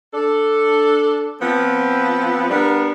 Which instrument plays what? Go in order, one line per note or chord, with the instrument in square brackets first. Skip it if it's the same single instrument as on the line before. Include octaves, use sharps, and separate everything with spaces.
[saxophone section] D4 A4
F3 B3 C4
G3 B3 D4 A#4